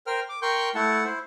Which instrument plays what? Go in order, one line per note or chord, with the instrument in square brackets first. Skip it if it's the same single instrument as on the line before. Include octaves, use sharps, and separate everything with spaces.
[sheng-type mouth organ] A#4 C5 G5 F6
D6
A#4 G5 C6 C#6 G6
A3 E4 F#5 A5
E4 C5